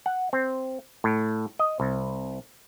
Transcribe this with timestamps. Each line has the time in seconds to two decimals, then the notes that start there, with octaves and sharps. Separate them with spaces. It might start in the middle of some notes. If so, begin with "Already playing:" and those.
0.06 F#5
0.33 C4
1.04 A2
1.59 D#5
1.80 C2